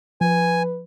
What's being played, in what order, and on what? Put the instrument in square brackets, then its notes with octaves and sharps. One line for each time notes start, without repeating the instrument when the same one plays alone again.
[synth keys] F3 [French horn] B4 [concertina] G#5